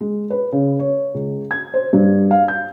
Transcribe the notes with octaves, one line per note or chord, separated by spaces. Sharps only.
G#3
B4
C#3
C#5
C#2
G#6
C5
G2
F5
G6